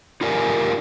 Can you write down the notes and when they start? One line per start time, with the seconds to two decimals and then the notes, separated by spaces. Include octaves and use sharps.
0.21 D#4 F4 G4 A#4 D5 G#5